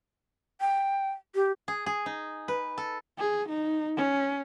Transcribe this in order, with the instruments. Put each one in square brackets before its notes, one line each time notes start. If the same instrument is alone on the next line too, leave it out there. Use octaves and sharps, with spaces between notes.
[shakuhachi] G5
G4
[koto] G#4
G#4
D#4
B4
A4
[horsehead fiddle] G#4
D#4
C#4